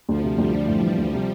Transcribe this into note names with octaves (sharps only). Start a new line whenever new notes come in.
D2 F3
C3
D2 G3
D3
A2
E3
D2
C3